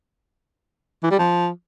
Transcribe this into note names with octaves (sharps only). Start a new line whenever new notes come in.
E3
G3
F3